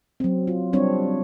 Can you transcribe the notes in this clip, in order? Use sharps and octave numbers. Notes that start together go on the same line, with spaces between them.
F#3 C4
F4
G3 C4 D4 C#5